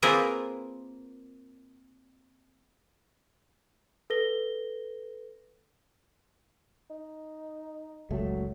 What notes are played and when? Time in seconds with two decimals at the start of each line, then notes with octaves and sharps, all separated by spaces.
0.02 A#3 C4 F4 G#4 A#4 B4
4.10 A4 B4 A#6 G7
6.90 D#4
8.10 F#1 C#2 F#3 A3